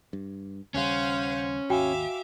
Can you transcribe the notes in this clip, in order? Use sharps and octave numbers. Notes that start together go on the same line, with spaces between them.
G2
D#2 C#3 G3 C#4 C5 F5 F#5
G#1 D#2 F#4 E5 F5 G5 G#5 D6